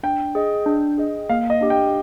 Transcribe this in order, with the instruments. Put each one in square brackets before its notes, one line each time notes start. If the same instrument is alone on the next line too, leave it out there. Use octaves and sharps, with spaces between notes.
[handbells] D4 [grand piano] G5
[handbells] G#4 D#5
D4
G#4 D#5
[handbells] A#3 [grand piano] F5
[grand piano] D#5
[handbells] D4 G4
[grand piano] G5